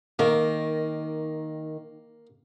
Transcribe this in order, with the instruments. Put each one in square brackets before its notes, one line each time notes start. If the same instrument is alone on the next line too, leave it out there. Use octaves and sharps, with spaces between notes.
[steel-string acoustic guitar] D#3 [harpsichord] A#3